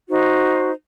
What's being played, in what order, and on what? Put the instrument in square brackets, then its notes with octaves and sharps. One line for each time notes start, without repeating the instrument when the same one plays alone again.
[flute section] D#4 F#4 C5